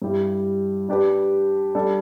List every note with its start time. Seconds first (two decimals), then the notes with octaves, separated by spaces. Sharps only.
0.02 G2 G3 E4 G4
0.89 G3 D4 G4 B4
1.75 G3 D4 A4